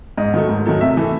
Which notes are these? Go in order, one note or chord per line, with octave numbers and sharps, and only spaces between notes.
G#2 D#5
D#3 F#3 A3
G#2
D#3 F#3 A3
C3 E5
E3 A3